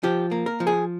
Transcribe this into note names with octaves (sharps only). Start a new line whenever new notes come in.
F3 G4
A#3
A#4
F3
G#4